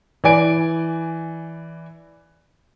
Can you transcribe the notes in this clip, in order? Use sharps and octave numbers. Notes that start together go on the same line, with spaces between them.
E3 D5 G#5 D7